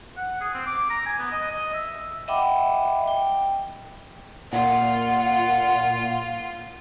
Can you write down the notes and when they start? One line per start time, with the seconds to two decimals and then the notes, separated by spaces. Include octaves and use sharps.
0.17 F#5
0.41 G#4
0.54 C4
0.66 D6
0.90 A#5
1.06 G#5
1.19 B3
1.32 D#5
1.51 D#5
1.74 E5
2.28 D#5 E5 F#5 G5 B5 D6
3.07 G5
4.53 A#2 F4 F#5